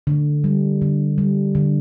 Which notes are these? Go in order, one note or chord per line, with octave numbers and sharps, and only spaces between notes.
D3
G3
D3
G3
D3